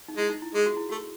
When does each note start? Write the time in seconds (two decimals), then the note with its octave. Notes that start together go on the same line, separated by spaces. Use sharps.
0.08 D#4
0.17 G#3 E4
0.30 D#4
0.42 E4
0.54 G#3 G#4
0.66 F#4
0.77 E4
0.89 A3 F#4